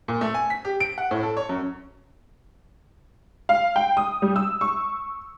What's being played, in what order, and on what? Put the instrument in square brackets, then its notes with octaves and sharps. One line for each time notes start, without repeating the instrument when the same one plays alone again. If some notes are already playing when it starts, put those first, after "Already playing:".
[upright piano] A#2
A3
G#5
B6
G4
D7
F#5
A2
A4
C#5
F#2
[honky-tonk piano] F5
G5
D#6
G3
E6
C#6